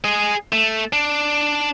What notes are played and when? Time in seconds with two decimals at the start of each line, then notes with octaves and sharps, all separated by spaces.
0.04 G#4 D#5
0.52 A3
0.93 D4